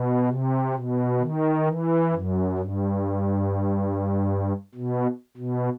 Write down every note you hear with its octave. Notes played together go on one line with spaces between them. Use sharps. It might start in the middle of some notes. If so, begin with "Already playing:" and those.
Already playing: B2
C3
B2
D#3
E3
F#2
G2
B2
B2